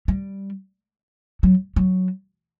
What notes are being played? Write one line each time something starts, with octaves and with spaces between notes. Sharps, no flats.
G3
F#3
F#3